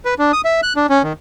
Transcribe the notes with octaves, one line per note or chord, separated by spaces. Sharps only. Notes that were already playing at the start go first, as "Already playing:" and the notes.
B4
D4
D#6
E5
F#6
D4
C#4
D#3